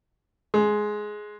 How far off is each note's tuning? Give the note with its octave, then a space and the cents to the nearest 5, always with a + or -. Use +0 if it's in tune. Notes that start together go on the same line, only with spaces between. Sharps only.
G#3 +10